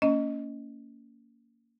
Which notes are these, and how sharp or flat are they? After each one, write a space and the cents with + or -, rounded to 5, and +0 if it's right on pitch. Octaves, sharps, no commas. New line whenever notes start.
A#3 -15 C#4 +20 D#5 +0